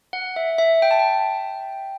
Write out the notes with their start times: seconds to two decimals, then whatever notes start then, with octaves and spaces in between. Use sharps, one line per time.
0.13 F#5
0.36 E5
0.58 E5
0.82 G5
0.91 A5
0.99 G5